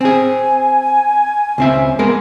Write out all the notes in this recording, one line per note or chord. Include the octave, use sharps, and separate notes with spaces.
C4 G#4 G#5
C#2 C4 E5
G#3 B3 A#4